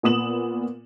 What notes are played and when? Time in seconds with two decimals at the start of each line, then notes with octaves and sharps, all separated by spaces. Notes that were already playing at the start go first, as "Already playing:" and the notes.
0.03 A#2 B3 D#6 E7 F#7